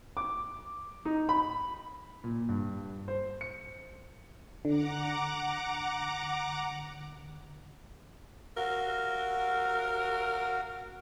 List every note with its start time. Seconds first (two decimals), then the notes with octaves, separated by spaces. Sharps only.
0.17 D6
1.05 D#4
1.29 B5
2.24 A#2
2.49 G2
3.08 C5
3.41 C#7
4.65 D3 F#5 A#5 D6
8.57 F#4 A#4 F5